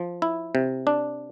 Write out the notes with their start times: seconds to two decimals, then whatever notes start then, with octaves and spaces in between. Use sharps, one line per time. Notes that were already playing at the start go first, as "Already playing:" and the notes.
Already playing: F3
0.22 E4
0.55 C3
0.87 D4